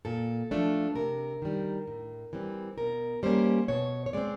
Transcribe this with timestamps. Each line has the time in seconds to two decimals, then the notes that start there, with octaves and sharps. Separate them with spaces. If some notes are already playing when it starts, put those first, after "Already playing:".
0.05 A#2 A4
0.51 F3 A3 D4
0.95 C3 A#4
1.42 D#3 G3
1.87 A2
2.33 E3 G3 C4
2.78 B2 A#4
3.23 G3 A#3 C#4 C5
3.68 B2 C#5
4.06 C#5
4.13 G#3 C4 D5